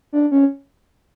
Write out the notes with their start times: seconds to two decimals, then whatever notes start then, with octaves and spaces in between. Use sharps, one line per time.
0.13 D4
0.31 C#4